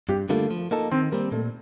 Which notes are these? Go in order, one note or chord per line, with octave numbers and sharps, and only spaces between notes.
G2 G4
D3 G3 A3 A#3 F4
F3
A#3 D#4 A4
D#3 C4
G3 A#3 C4
A#2 A3